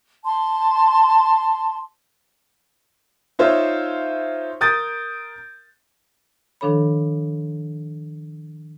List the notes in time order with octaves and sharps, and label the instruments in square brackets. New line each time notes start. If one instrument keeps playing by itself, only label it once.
[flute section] A5 C6
[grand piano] D#4 F4 C5 C#5 E5
A#4 D#6 G6 A6
[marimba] D#3 F3 D4 A4 C#5 B5